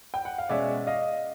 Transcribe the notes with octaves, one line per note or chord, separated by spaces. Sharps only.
G5
F#5
F5
B2 G#3 C#4 D5 E5
D#5 F5